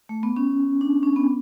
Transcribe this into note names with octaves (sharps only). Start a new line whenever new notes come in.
A3
B3
C#4
D4
C#4
B3